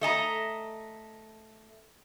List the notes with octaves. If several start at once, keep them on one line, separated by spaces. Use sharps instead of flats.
A3 D#5 A5 A#5